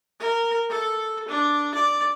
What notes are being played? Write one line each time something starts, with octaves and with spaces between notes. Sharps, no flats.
A#4
A4
D4
D5